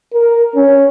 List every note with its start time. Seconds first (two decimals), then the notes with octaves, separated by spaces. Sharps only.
0.13 A#4
0.55 C#4